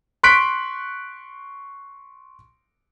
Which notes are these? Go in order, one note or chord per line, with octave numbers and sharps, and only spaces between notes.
C6 C#6 F#6 B6 D7